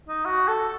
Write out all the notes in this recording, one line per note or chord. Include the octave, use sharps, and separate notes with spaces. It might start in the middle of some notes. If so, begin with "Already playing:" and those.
D#4
F#4
A4